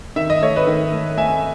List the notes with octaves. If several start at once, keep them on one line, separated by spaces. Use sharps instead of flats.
D#3 E5
D#5
A3 C#5
B4 D#5
D#3
A3
A3 E5 G#5